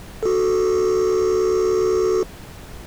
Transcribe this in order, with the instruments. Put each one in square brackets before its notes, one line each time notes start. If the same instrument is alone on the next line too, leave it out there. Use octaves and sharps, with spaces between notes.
[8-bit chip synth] F#4 A4